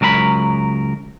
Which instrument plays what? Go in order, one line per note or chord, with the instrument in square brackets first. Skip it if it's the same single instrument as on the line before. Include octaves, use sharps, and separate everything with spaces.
[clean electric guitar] C#2 F#3 A#4 E5 B5